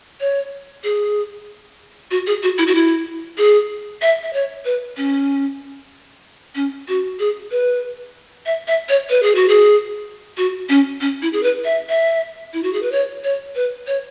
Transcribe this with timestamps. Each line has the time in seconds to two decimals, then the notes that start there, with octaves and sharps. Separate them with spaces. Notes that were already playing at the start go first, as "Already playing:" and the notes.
0.20 C#5
0.84 G#4
2.11 F#4
2.27 G#4
2.43 F#4
2.58 E4
2.67 F#4
2.75 E4
3.38 G#4
4.02 E5
4.23 E5
4.33 C#5
4.65 B4
4.97 C#4
6.55 C#4
6.88 F#4
7.19 G#4
7.51 B4
8.46 E5
8.68 E5
8.89 C#5
9.10 B4
9.23 G#4
9.35 F#4
9.49 G#4
10.37 F#4
10.69 C#4
11.01 C#4
11.22 E4
11.33 G#4
11.43 B4
11.65 E5
11.89 E5
12.54 E4
12.63 F#4
12.73 G#4
12.83 B4
12.92 C#5
13.24 C#5
13.55 B4
13.87 C#5